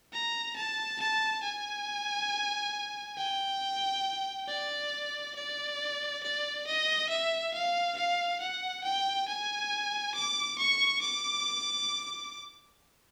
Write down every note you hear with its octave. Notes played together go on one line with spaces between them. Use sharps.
A#5
A5
A5
G#5
G5
D5
D5
D5
D#5
E5
F5
F5
F#5
G5
G#5
D6
C#6
D6